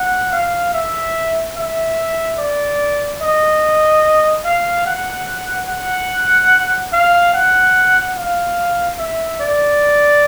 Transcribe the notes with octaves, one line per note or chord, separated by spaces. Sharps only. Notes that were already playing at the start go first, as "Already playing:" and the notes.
Already playing: F#5
F5
E5
E5
D5
D#5
F5
F#5
F#5
F5
F#5
F5
E5
D5